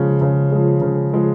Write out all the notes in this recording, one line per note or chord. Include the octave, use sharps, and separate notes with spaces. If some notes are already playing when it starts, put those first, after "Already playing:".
Already playing: C#3 F3 G#3
C#3
F3 G#3
C#3
F3 G#3